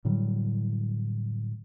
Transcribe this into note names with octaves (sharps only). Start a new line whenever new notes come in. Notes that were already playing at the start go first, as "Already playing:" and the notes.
A2 D3 F#3 G3